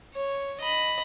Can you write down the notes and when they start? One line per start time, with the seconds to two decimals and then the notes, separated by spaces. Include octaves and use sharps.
0.14 C#5
0.61 D#5 B5